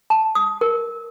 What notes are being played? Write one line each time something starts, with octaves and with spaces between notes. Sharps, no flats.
A5
D#6
A#4